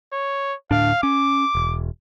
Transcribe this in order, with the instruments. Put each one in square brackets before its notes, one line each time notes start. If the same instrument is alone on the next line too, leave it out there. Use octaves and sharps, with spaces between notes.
[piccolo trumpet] C#5
[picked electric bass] D2 A2 D4 [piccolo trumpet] F5
[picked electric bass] C#4 [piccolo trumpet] D6
[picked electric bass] E1